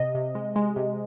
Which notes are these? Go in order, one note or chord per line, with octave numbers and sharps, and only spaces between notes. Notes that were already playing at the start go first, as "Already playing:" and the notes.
Already playing: C3 D#5
C3
G#3
G#3
C3